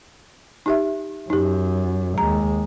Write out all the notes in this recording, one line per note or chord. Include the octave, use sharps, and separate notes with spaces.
D#4 G4 E5
F#2 D#4 G4
D#2 G#3 A#5